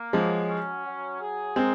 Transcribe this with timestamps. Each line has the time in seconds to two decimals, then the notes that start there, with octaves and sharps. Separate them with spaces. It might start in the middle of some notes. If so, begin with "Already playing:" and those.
Already playing: A#3
0.13 F3 F#3 G#3
0.49 C#4
0.85 F#3
1.21 G#4
1.56 G#3 C4 A#4